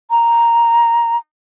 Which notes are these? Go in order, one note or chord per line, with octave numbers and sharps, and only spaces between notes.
A#5